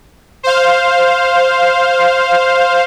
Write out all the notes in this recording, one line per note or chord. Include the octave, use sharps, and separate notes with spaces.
C5 F5